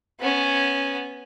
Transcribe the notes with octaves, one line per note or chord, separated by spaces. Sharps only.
B3 C#4